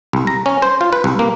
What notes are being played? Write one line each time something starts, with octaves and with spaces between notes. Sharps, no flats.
C2
A#5
C#4
C5
F4
B4
C2
A#3